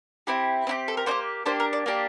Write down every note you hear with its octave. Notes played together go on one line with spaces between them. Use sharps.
C4 E4 G4
C4 E4 G4
A4
A#4
A#3 D4 G4 C5
A#3 D4 G4 C5
A#4
D5
A#3 D4 G4